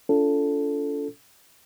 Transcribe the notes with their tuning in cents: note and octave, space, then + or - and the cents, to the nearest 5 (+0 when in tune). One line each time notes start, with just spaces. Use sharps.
D4 -45 F4 -25 A4 +0